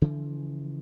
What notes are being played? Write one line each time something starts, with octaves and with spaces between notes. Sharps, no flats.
C#3 E3 F3